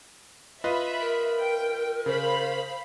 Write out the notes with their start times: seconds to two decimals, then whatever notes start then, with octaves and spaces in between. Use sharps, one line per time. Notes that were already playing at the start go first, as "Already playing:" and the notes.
0.64 F4 B4 D#5 E5 B5
1.01 A#4
1.41 G5
2.06 C#3 C5 F5 B5